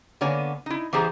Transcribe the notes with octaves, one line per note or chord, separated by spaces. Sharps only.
D3 A#3 B3 C#5 G#5
D#4 E4
E3 B3 G4 G#4 C5 A#5